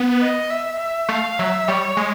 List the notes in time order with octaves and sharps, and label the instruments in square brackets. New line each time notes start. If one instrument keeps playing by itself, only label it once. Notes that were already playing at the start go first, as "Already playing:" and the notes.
Already playing: [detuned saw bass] B3
[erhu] D#5
E5
E5
[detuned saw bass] A3 [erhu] F5
[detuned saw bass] F#3 [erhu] E5
[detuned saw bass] G3 [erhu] C#5
[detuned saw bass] G#3